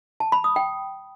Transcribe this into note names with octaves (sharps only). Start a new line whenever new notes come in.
A5
B5
D#6
G5